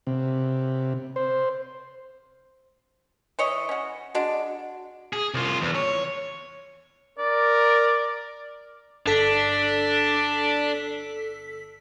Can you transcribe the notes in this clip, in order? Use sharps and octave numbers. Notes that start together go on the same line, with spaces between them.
C3
C5
E3 C#5 D#5
C#4 F#4
G#3 D4 F#4 D#5 F#5
G#4
C2 F4
E2
C#5
A#4 D5
G1 D4 A4 B6